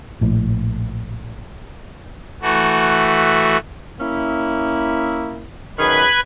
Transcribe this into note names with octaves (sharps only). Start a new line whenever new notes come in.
A#1 A2
E3 A3 F#4
A#3 C#4 E4
F#2 D#3 G#4 B4 B5 G#6